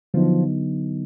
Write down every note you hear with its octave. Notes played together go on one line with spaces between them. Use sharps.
D3 F3 F#3 B3 D#4